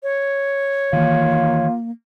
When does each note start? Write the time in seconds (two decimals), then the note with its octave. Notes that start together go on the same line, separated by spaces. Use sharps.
0.03 C#5
0.93 D#3 E3 A#3 F4